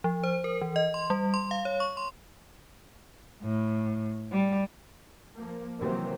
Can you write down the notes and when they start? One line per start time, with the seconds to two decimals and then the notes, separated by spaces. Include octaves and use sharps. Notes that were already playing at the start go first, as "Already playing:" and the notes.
0.04 F3
0.24 C5
0.44 A#4
0.61 E3
0.76 D#5
0.94 C6
1.10 G3
1.34 C6
1.51 F5
1.65 C#5
1.80 C#6
1.97 C6
3.43 A2
4.32 G3
5.36 F3 A#3
5.78 C3 D#3 E3 F#3 A#3 C4